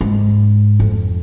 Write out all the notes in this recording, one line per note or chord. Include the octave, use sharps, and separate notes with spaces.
G#2
F2